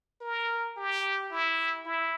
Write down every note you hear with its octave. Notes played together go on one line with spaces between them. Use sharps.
A#4
G4
E4
E4